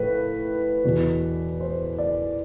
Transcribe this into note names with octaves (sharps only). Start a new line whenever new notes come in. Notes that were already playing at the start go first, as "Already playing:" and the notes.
Already playing: A2 F3 B4
E2 B2
C5
D5